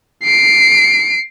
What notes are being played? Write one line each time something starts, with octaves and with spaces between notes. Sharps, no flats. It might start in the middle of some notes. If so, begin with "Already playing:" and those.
C7 D7